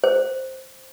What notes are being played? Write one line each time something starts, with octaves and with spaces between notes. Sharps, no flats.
C5